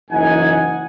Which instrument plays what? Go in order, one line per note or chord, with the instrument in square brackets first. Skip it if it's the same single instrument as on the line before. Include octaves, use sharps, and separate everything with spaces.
[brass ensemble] F#1 E3 D#4 F#5 G#5